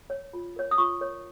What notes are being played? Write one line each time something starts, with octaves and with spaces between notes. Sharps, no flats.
C#5
F4
A#4 C#5
D#6
F4 C#6
A#4 C#5